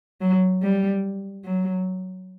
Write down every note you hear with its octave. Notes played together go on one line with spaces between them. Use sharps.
F#3
G3
F#3